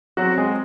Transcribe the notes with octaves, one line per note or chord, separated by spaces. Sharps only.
F#3 C4 F#4
G#3 G#4